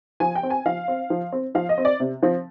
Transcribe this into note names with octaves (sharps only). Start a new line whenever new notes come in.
F3 G#5
G5
C4
G#5
F3 F5
C4
F3
C4
F3 F5
D#5
C4
D5
C3
F3 C4